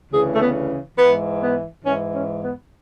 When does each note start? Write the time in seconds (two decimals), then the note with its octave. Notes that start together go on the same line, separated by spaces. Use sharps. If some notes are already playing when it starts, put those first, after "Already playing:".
0.11 D2 C#3 E3 G#4
0.33 A3
0.40 B3
0.97 G#2 E3 B3
1.41 B3
1.84 G#2 E3 C#4
2.13 C#4
2.42 B3